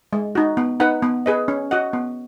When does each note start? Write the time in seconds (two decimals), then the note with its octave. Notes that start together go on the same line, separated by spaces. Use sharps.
0.13 G#3
0.35 D#4 F#4
0.57 B3
0.80 D#4 B4 F#5
1.02 B3
1.26 G#4 B4 D#5
1.48 C#4
1.71 F#4 D#5 F#5
1.93 B3